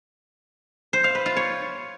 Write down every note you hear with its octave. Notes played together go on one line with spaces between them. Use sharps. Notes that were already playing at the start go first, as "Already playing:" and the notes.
C5
F5
B4
F4
C#5